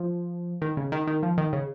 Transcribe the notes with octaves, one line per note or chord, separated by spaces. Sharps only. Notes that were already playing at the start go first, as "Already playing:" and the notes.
Already playing: F3
D#3
C#3
D#3
D#3
F3
D#3
C#3